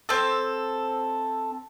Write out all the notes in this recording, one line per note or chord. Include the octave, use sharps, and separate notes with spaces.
C4 A4